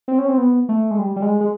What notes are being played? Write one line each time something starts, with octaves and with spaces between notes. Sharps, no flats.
C4
C#4
C4
B3
A3
G#3
G3
G3
G#3
G#3